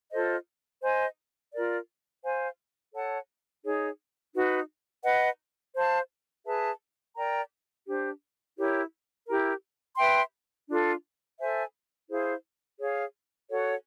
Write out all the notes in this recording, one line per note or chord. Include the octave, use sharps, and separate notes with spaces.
F4 A4 C5 D#5
C5 D#5 G#5
F4 A#4 D5
C5 F5 G#5
A4 C#5 F#5 A5
D#4 G#4 C#5
D#4 F#4 B4
B4 D#5 F#5
C5 F5 A5
G#4 B4 E5 A5
A#4 D5 G5 A#5
D4 G4 C5
E4 G4 A#4 C#5
E4 G4 A#4
B4 E5 G5 C6
D4 F4 A4
A4 C5 E5 G#5
E4 G#4 C5 F5
G#4 C#5 F5
F#4 A4 C#5 F#5